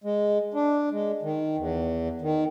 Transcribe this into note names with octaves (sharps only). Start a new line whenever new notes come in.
G#3
D4
G#3
D#3
E2
D#3